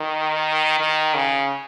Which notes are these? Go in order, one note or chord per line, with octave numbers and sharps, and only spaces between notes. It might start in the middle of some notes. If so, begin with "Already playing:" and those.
Already playing: D#3
D#3
C#3